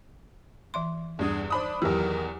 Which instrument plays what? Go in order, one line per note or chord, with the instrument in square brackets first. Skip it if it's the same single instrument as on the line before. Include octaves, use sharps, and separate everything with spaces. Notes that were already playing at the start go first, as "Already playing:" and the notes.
[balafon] E3 E5 C6
[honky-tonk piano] E2 G2 [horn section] D4 G#4
[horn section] D4 [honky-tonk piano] C5 B5 D#6
[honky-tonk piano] E2 E3 [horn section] D#3 A#4 [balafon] F#3 G4